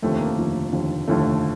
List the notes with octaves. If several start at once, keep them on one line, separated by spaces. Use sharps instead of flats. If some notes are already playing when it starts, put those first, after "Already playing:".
F1 D#2 D3 F3 A3 C4
A#3
F1 D#2 D3 F3
F1 D#2 D3 F3
F1 D#2 D3 F3 A3